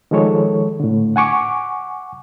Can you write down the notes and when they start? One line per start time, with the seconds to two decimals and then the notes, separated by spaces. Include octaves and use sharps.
0.11 D#3 F3 G#3 A4 C#5
0.80 A2 D3
1.16 F#5 G#5 C#6 D6